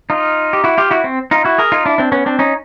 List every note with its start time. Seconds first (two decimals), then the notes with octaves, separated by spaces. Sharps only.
0.10 D#4 F4
0.53 G4
0.64 E4 F#4
0.78 F4 G4
0.91 E4 F#4
1.04 C4
1.31 D#4 F4
1.45 E4 F#4
1.58 G#4 A#4
1.72 D#4 F4
1.86 D4 E4
1.98 C4 D4
2.12 B3 C#4
2.26 C4 D4
2.39 C#4 D#4